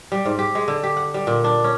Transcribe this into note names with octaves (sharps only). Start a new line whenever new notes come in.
G3
G#2
G4
G#3
D3
G4
F#5
G3
A#2
D4
C#4